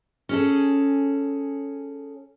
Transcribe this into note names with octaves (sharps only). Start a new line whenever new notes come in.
C#4 G#4 A4